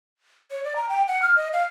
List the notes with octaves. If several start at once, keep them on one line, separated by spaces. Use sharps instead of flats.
C#5
D5
A#5
G5
F#5
F6
D#5
F5